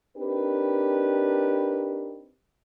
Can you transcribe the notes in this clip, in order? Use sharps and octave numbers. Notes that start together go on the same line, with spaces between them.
C4 D4 D#4 G4 A#4 B4